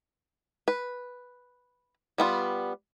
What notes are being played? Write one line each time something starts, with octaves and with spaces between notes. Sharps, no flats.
B4
G3 B3 F4